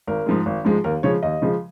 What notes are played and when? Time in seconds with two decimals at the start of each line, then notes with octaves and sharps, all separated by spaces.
0.07 G#1 A#4
0.26 G#2 F3 G#3
0.46 G#1
0.65 G#2 F3 G#3
0.84 D#2 A#4
1.03 C#3 F3 G#3 C#5
1.23 D#2 D#5
1.42 C#3 F3 G#3